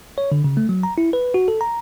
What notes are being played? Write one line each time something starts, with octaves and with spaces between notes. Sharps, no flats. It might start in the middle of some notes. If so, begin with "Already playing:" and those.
C#5
D3
C#3
A3
F#3
A#5
E4
B4
F#4
A4
A#5